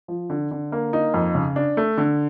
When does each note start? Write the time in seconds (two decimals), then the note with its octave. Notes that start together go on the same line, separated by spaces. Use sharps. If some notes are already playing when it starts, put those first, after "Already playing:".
0.08 F3
0.30 D3
0.51 D3
0.72 A#3
0.93 D#4
1.14 F2
1.35 C#3
1.56 D4
1.77 A3
1.98 D3